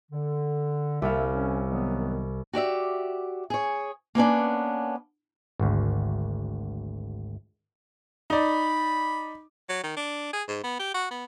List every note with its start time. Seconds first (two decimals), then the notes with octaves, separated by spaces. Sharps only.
0.12 D3
1.02 C2 A#3 A4 E5 F5
1.35 C#4
1.70 D#3 F#3 B3
2.53 F#4 G4 D5 E5
3.50 G#4 C#5
4.15 A#3 B3 C#4 D4
5.59 G#1 D2
8.30 D#4 D5 B5
9.69 F#3
9.84 D#3
9.97 D4
10.33 G#4
10.48 G#2
10.64 B3
10.80 G4
10.95 F#4
11.11 B3